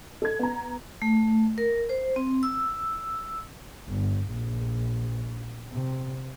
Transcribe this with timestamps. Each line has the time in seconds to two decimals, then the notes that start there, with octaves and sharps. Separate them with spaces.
0.22 A4 G#6
0.39 B3 A#5
1.02 A3
1.58 A#4
1.89 C5
2.16 C4
2.43 E6
3.87 G1
4.29 A#1
5.72 C3